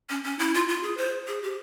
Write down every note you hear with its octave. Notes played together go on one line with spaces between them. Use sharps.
C#4
C#4
E4
F4
F4
G#4
C5
G#4
G4